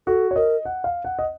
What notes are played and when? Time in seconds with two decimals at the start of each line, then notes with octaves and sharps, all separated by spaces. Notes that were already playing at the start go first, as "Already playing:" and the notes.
0.07 F#4 A4
0.31 C#5
0.36 A#4 D#5
0.65 F#5
0.84 F5
1.05 F#5
1.19 D#5